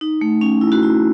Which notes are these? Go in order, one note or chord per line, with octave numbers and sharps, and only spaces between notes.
D#4
A3
C#4
E4
F#4
E4